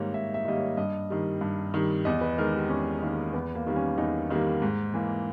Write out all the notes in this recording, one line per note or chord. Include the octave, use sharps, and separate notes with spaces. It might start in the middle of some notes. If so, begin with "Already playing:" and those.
Already playing: G#2 D#3 G3 A#3 D#4 C#5
G#2 E5
E5
D#3 G3 A#3 D#5
C#5
G2 D#5
D#3 G3
G2
D#3 G3
E2 D#5
B4
D#3 G#3 A#4
G4
E2 C#4
D#3 G#3 A#3
E2 B3
A#3
D#3 G3 A#3
C#4
E2 D#4
D#3 G3 A#3
G#2
E3 A#3